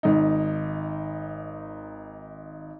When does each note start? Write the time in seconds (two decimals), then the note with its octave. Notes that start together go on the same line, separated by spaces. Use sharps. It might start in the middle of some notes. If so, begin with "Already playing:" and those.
0.03 G#1 D#4